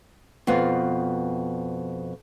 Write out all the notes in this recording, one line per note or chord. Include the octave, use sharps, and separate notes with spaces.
F2 B2 B3 F4